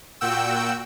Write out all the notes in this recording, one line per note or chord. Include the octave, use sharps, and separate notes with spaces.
A#2 F#4 G5 E6